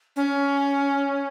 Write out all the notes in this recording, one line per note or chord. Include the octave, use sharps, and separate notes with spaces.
C#4